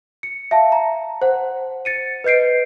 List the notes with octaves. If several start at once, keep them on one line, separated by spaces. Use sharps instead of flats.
C#7
E5 F5 A5
A#5
C5 F#5
A6 C#7 D#7
B4 D#5 G6 C7 D7